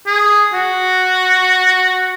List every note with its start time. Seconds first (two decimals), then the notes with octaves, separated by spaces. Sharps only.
0.07 G#4
0.53 F#4